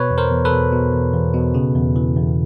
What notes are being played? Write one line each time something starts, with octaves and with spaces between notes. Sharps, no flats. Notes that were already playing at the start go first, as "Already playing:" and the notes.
Already playing: B2 B4 C#5
E2
A#4 C5
E2
A4 B4
B2
B2
E2
E2
B2
C#3
E2
E3
E2